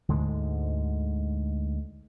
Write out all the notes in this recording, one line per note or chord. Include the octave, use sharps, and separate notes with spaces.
D2 G#2 D3 G#3